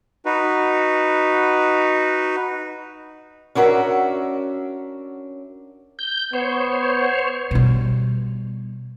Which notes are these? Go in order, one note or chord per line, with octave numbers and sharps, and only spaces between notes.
D#4 F#4 B4
C#4 D4 F#4 A#4 E5
G6
B3 C5 C#5
B2 G3